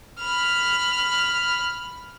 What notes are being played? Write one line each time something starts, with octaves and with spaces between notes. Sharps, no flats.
B5 F6